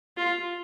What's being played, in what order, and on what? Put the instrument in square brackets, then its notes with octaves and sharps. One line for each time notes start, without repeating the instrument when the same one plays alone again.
[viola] F4